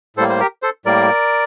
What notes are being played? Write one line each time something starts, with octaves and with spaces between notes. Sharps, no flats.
A2 G3 A#3 A4 C5
C5
G4 A#4
A4 C5
A2 G3 A#3 A#4 D5